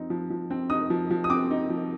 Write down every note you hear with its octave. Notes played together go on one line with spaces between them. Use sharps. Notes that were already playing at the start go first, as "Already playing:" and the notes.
Already playing: F3 C4 D#4
F3
F3
C4
D#4 D#6
F3
F3
D#6
C4 D6
D#4
F3